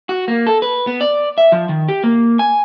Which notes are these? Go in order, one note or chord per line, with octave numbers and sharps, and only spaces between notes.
F#4
A#3
A4
B4
B3
D5
E5
F3
D#3
G4
A#3
G#5